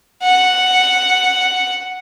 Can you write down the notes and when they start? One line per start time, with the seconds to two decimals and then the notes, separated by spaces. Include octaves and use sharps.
0.22 F#5